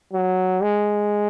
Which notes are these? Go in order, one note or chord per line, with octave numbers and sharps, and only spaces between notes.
F#3
G#3